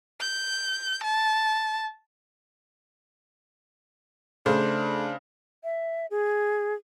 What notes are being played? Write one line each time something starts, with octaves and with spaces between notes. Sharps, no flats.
G6
A5
C#3 A3 D4 C5
E5
G#4